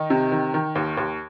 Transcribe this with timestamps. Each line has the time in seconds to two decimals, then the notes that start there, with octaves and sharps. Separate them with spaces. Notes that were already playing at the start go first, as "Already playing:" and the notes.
Already playing: D#3 D#4
0.10 C3
0.32 D#3
0.54 D#3
0.75 D#2
0.97 D#2